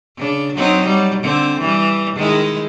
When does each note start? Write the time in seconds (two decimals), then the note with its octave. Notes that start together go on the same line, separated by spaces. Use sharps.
0.17 C#3 D4
0.55 F#3 C4 D#4
0.86 F#3 G3
1.23 D3 C4
1.60 E3 G3
2.16 D#3 G#3 E4